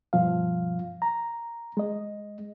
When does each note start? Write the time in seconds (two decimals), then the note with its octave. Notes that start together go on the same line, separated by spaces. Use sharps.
0.13 G2 B2 F3 F5
1.02 A#5
1.77 G#3 D#5